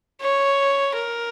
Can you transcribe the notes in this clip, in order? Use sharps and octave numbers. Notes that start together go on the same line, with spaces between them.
C#5
A#4